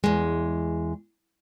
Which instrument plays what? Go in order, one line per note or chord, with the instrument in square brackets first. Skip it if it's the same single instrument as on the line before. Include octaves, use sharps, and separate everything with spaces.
[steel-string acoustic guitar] E2 G#3